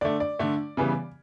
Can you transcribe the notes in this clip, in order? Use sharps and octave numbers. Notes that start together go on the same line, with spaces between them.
D3 A3 D5
D5
D3 A3
C#3 E3 G3 B3